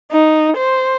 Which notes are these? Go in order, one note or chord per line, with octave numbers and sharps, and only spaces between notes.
D#4
C5